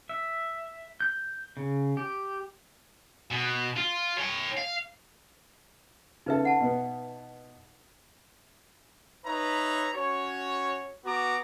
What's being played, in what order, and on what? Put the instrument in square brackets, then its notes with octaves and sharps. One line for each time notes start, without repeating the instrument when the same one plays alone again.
[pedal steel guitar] E5
G6
C#3
G4
[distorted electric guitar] B2
F4
C#5 G5
F5
[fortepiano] C#3 A4 [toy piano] D#4 B4 E5
[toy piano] F#5 A5
[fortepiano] B2 B3
[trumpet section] D#4 B4 C#5 E5 A#5
C#4 F#4 C#5
B3 F#4 A#5 D6